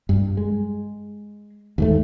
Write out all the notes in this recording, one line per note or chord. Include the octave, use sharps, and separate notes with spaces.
G2
G#3
D#2 G#2 A3